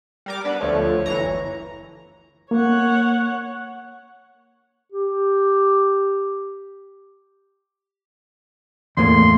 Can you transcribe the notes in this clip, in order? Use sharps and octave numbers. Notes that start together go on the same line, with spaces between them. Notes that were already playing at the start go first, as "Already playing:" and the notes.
G3 A#4 D6
B3 D4 B4
D2 F3 A3 C#5
G1 E3 A#5
A#3 C#5 F#5
G4
E2 A2 A#3 C6